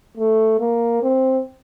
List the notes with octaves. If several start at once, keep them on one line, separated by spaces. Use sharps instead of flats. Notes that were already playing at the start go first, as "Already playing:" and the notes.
A3
A#3
C4